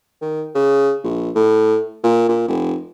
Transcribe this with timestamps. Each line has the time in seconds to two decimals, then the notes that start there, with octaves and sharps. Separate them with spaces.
0.22 D#3
0.55 C#3
1.03 A#1
1.35 A2
2.04 A#2
2.29 A#2
2.48 F1